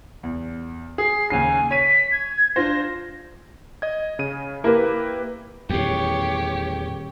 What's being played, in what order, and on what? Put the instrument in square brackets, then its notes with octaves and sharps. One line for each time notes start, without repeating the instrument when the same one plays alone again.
[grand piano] E2
[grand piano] G#4 [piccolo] C7
[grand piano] D#2 C#3 C7 [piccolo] G#5
[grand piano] C#5 D#7 [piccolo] B6
[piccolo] G#6
[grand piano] D4 F4 C5 [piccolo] A#6
[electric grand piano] D#5 G#6
C#3 D#7
[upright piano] A#3 [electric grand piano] E4 G4 B4
[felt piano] D#1 [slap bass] E2 A2 [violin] G4 C#5